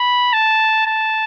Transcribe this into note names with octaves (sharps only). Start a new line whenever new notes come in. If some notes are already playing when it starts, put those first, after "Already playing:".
Already playing: B5
A5
A5